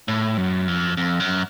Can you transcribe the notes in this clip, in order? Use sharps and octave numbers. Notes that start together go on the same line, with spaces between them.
A2
F#2
F2
F2
F#2